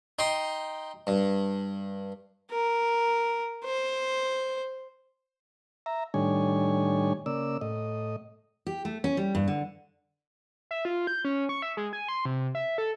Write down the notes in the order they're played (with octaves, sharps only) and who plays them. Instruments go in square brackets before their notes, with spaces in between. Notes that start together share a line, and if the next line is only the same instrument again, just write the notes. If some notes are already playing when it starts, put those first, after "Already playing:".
[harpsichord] D#4 G5 C6
G2
[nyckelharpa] A#4
C5
[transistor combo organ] E5 A#5
A2 D#3 G3 D4 C#5 G#5
C#3 A#3 D5 E6
A2 D#5
[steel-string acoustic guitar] G4
A3
C#4
G3
G2
D3
[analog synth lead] E5
F4
G6
C#4
C#6
E5
G#3
G#5
C6
C3
E5
A4